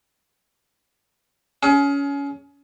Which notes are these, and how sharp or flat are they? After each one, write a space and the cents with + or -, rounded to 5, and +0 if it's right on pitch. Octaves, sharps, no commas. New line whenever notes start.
C#4 +25 G#4 +30